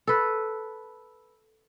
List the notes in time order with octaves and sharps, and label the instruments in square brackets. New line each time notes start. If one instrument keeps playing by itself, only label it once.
[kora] A4 B4